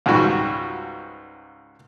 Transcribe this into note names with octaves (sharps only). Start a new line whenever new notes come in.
C#2 G#2 G3 F#4